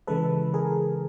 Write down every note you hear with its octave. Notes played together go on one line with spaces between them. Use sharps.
C#3 E3 G#3 A4 B4
G#4 A#4